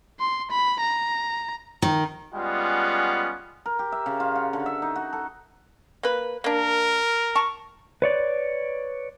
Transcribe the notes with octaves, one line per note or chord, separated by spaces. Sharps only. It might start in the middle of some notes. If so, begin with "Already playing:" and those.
C6
B5
A#5
D#3
G3 G#3 B3 C#4 F4 F#5
A#4
G4
E5
C#3
F4
F#4
D3
E5
D#4
F#4
A4
A#3 B4
A#3 D4 A#4
A5 C#6
B4 C#5 D5